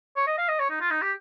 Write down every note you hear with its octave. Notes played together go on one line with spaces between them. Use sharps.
C#5
D#5
F5
D#5
C#5
D#4
F4
D#4
G4